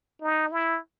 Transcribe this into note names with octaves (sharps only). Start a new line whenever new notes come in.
D#4
E4